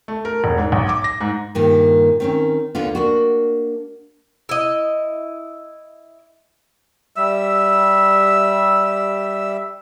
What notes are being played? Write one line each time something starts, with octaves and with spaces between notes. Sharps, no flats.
A3
A#4
E1
G#2
B1
D6
A#6
G#2
G2 A#2 D#3
D#3 C4 C#4
D2 D3 B3 F4
A#3 D4 F#4
E4 D#5
G3 E5 E6